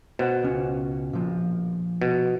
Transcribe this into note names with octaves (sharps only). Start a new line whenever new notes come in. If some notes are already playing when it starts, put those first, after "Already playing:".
B2 C5 F#5
C#2 C#4
A#2 F3
B2